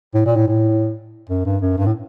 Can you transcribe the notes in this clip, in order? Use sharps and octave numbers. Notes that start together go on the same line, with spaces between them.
A2
A#2
A2
A2
F#2
G2
F#2
G2
A2